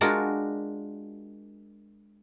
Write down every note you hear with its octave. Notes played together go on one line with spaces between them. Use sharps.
G#3 D4 F4 F#4 A#4